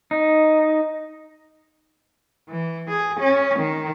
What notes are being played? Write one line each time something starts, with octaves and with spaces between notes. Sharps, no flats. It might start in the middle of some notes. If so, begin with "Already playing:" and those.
D#4
E3
G#4
C#4
D#3